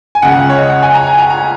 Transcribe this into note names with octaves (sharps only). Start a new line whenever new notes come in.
G#5
C#2 C#3 F#5
C#5
D#5
F#5
G#5
A#5
G#5
A#5
A#5